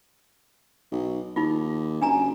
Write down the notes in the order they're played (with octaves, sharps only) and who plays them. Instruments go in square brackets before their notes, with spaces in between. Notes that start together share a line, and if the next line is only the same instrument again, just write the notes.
[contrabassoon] B1
[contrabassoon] D#2 [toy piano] D#4 F4
[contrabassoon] F#1 [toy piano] D4 G#5 A#5